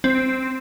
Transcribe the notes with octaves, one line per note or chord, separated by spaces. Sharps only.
C4